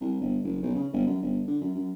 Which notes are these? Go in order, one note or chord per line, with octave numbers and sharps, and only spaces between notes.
C2
G1
F#1
B1
C#3
G1
F#2
G1
D3
F#2
F#2